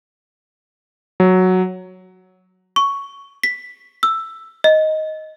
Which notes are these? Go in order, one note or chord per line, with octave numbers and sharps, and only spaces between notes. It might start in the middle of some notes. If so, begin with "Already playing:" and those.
F#3
C#6
B6
E6
D#5